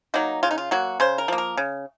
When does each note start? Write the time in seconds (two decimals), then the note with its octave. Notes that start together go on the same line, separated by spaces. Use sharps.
0.14 F#3 A#3 D#4
0.43 C#3 F4
0.51 D#4
0.58 F4
0.71 F#3 A#3 F#4
1.00 C#3 C5
1.18 A#4
1.28 F3 A#3
1.38 A#4
1.57 C#3